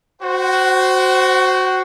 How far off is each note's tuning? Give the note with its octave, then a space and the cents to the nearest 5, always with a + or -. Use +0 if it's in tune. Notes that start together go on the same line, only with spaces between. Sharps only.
F#4 +0 C5 -5 F#5 +40